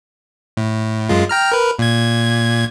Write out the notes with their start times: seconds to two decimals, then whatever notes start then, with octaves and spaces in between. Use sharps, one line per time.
0.57 A2
1.09 F#2 G#3 F4
1.29 G5 A#5 F6
1.52 A#4 B4
1.79 A#2 G#6